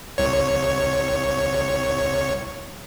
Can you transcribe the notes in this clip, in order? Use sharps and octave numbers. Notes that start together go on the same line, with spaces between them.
C2 C#5